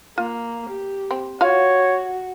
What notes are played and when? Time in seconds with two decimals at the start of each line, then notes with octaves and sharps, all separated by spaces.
0.18 A#3 F4
0.69 G4
1.11 C4
1.41 F4 F#4 C#5 F5